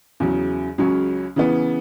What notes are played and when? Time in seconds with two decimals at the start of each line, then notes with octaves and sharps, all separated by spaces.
0.20 E2 C#3 F#3
0.78 C#2 C#3 F#3 C#4
1.36 C#3 E3 B3